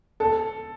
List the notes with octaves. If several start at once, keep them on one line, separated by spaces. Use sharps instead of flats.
A4